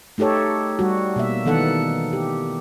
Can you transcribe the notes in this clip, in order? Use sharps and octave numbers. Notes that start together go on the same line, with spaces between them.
A3 D#4 G4 A4 C#5
G3 F#4
B2 A#3 E5
D#3 E3 B3 D#4 A4 F#5
G4